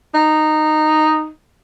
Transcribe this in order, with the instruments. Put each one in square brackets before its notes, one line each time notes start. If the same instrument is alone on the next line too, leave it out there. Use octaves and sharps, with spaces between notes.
[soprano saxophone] D#4